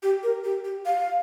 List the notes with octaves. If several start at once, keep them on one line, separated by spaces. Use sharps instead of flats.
G4
A#4
G4
G4
F5